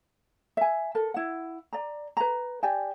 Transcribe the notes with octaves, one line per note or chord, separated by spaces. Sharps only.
E5 G#5
A4 A#4
E4 F#5
D5 A#5
B4 A#5
G4 D5 G5 G#5